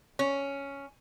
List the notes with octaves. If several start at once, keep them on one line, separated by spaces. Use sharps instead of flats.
C#4